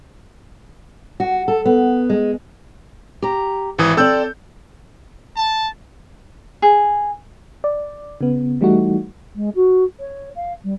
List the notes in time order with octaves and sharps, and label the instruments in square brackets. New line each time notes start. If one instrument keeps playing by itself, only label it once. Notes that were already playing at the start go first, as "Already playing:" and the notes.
[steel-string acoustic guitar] F#4
A4
B3
G#3
G4 A#5
[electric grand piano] G#1 E3 D#6 [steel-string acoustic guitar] E5
[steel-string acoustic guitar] C4 D5 [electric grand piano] A4 E6 G6
[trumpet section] A5
[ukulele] G#4
[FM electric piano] D5
C#3 B3
E3 G3 A3 D#4 F#4
[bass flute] G#3
F#4
C#5
F5
G3